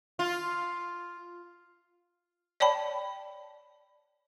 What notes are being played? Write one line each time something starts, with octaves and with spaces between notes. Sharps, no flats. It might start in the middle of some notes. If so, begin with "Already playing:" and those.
F4
C#5 D5 G5 A5 B5